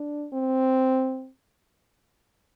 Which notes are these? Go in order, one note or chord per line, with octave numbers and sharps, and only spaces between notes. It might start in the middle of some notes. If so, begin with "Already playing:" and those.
Already playing: D4
C4